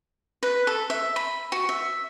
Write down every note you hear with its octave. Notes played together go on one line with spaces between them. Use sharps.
B4
A4
E5
B5
F#4
E5